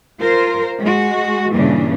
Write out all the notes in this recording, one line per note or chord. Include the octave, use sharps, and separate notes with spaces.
F4 A#4 C5
G#3 F#4
G2 A#2 C#3 E3 D4